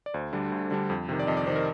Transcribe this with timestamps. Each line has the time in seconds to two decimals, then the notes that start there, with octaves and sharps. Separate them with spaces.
0.06 D5
0.14 D2 C5
0.33 D3 G3 D4
0.52 D2
0.71 D3 G3 D4
0.90 F2
1.09 C3 D#3
1.19 D5
1.27 F2 D#5
1.37 D5
1.47 C3 D#3 C5
1.56 A#4